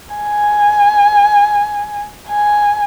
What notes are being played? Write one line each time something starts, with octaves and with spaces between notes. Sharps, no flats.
G#5
G#5